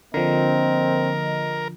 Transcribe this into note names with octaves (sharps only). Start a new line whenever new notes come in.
D3 F3 A#3 C4 A#4 D#5